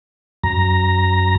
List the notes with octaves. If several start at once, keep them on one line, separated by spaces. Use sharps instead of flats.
F#2 A#5